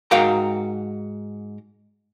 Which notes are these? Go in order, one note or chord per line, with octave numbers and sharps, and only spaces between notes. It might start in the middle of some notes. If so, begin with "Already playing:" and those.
G#2 F#4 A#4 F5 G5 A#5